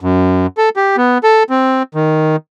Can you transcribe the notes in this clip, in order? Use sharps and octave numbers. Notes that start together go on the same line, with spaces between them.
F#2
A4
G4
B3
A4
C4
D#3